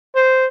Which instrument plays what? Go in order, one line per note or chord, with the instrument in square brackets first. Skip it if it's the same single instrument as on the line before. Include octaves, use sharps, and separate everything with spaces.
[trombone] C5